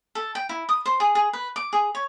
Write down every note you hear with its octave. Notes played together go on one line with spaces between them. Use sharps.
A4
G5
E4
D#6
C5
G#4
G#4
B4
D6
G#4
C#5